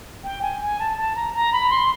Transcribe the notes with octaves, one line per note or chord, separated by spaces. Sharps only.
G5
G#5
G#5
A5
A5
A#5
A#5
B5
C6